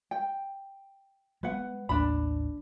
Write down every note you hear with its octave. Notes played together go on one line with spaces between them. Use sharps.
G5
G#3 B3 B4 F#5
A1 D#2 D4 B5